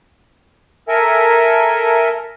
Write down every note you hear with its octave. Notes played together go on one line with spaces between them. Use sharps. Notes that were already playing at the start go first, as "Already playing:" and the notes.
A4 A#4 E5 G#5